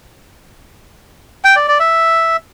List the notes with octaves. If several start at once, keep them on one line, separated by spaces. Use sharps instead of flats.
G5
D5
D5
E5